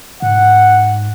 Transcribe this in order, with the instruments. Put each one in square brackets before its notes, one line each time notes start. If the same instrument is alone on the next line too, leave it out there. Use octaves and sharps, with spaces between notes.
[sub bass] G#2 [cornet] F#5